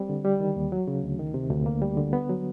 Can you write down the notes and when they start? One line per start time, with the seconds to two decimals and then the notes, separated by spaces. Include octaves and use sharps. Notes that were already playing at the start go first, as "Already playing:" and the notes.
Already playing: G3 C4
0.09 D3
0.25 G3
0.40 D#3
0.56 D#2
0.72 F#3
0.88 C#3
1.04 D2
1.19 D#3
1.34 C3
1.50 D2
1.66 A#3
1.82 G3
1.97 D3
2.13 B3
2.29 F#3